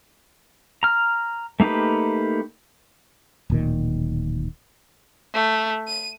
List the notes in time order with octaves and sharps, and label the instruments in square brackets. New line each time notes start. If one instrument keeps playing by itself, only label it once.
[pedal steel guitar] A#5 F6
A3 A#3 D#4 G4 B4
[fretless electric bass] D1 A#2 D#3
[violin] A3
D#7